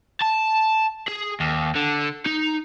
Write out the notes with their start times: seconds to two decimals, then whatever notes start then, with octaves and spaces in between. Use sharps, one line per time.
0.22 A5
1.08 G#4
1.40 D#2
1.75 D3
2.26 D#4